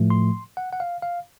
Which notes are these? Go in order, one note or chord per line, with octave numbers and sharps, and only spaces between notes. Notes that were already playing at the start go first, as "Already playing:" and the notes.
Already playing: A2 F3 A3
C6
F#5
F#5
F5
F5